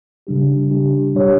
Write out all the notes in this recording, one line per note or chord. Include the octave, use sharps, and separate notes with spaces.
C#3 G3 D4 G4
C#3 G3 D4 G4
B2 G3 D4 G4 C#5